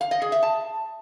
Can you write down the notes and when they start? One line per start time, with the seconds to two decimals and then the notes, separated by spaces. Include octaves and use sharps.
0.01 F5
0.11 D#5
0.22 G#4
0.32 E5
0.43 A5